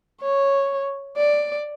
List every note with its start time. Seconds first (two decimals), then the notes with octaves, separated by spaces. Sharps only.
0.21 C#5
1.17 D5